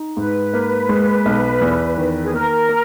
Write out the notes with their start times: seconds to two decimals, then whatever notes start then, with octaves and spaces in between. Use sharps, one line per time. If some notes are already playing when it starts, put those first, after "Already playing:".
Already playing: D#4
0.17 G#2 B4
0.54 A#3
0.89 G#3
1.26 B1
1.61 E2
1.97 D#3
2.23 G#4
2.34 A#3 A#4
2.69 A#3